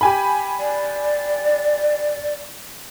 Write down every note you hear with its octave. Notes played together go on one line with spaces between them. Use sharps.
G4 G#5 B5
D5